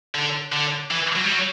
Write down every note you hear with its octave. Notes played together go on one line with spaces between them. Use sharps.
D3
D3
E3
F#3
G3
F#3